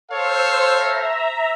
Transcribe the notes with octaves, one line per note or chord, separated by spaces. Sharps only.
A4 C5 C#5 F5 E6
E5 A#5